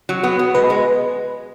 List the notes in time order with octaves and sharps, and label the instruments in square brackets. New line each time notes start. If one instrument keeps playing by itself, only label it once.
[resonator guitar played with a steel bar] F#3
B3
B3
[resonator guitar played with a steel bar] G#3 [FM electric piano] B4
[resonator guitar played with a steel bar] G#3